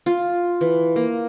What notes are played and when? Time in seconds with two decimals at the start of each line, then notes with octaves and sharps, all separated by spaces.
0.06 F4
0.61 E3
0.96 A#3